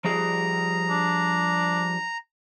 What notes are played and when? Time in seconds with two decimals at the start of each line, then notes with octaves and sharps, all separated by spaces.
0.04 F3 G3 G#4 A#5
0.90 D4